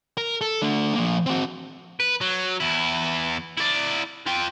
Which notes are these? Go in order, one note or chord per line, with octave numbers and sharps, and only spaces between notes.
A#4
A4
A3 D4
F3 A#3
C4 F#4
B4
F#3
E2 E4
E4 D5
F4 G5